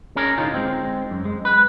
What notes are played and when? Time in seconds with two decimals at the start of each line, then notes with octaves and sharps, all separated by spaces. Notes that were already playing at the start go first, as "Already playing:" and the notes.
0.16 C#4 G#4 A#4
0.38 D2 A2 D#4 F4
0.54 G#3 C4
1.11 F#2
1.25 G#3
1.45 B4